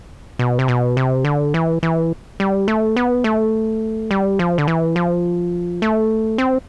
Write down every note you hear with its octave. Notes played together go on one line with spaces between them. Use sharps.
B2
C3
B2
C3
D3
E3
E3
G3
A3
B3
A3
G3
F3
D3
E3
F3
A3
C4